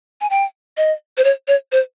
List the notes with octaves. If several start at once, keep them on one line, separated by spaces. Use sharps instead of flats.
G#5
G5
D#5
C5
C#5
C#5
C5